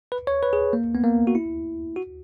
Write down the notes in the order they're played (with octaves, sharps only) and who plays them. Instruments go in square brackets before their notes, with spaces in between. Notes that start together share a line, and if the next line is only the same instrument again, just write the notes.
[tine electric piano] B4
C#5
B4
G#4
A#3
B3
A#3
F#4
E4
F#4